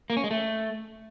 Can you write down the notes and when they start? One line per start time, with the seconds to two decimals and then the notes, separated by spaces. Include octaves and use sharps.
0.10 A#3
0.17 C#4
0.24 G#3
0.31 A3